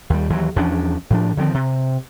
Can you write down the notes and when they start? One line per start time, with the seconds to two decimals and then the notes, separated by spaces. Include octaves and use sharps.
0.10 D#2 G3
0.30 D#2 E3 F#3
0.56 E2 F3 C#4 D4
1.10 A2 F3 D4
1.37 D3 D#3 F3 C4
1.54 C3